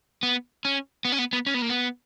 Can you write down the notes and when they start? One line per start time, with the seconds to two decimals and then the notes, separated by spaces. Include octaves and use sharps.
0.23 B3
0.65 C#4
1.05 B3
1.12 C#4
1.19 B3
1.33 B3
1.46 C#4
1.54 B3
1.62 A#3
1.69 B3